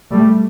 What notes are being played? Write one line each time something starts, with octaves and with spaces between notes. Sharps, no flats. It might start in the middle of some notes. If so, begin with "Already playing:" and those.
G3 A3